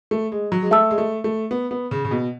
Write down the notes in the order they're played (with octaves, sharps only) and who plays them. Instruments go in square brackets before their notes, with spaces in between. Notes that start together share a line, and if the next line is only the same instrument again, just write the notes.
[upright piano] A3
G#3
F#3
G#3
[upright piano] A3 [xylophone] E5 A5 E6
[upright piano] G#3
A3
A3
B3
B3
C#3
C#3
B2